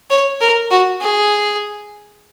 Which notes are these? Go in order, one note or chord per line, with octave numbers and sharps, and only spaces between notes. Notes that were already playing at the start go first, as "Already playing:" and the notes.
C#5
A#4
F#4
G#4